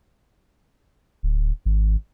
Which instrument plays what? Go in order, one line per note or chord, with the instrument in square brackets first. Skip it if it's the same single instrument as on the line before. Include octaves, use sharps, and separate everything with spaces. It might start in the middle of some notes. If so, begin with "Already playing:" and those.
[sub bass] D1
G#1